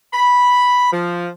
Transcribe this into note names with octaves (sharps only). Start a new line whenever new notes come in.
B5
F3